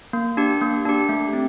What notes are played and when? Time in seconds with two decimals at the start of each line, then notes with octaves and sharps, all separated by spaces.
0.13 A#3
0.37 D4 G4
0.61 A#3
0.85 D4 G4
1.09 A3
1.33 C4